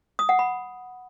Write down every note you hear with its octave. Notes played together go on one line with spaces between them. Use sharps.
D#6
F#5
B5